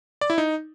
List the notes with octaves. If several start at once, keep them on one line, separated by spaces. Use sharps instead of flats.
D5
E4
D#4